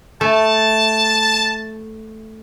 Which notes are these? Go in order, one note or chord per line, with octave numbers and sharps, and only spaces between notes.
A3 A5